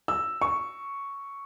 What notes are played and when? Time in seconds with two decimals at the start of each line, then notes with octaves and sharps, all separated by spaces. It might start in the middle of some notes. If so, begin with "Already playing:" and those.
0.08 E6
0.42 C#6